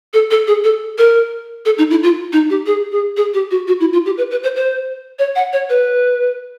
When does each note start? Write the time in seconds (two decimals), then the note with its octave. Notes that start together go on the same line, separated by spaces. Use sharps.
0.13 A4
0.31 A4
0.47 G#4
0.64 A4
0.98 A#4
1.65 A4
1.78 D#4
1.90 E4
2.03 F4
2.33 D#4
2.50 G4
2.66 G#4
2.92 G#4
3.17 G#4
3.34 G4
3.51 F#4
3.68 F#4
3.80 E4
3.93 F4
4.06 G4
4.17 B4
4.31 B4
4.43 C5
4.56 C5
5.19 C#5
5.35 F#5
5.53 C#5
5.69 B4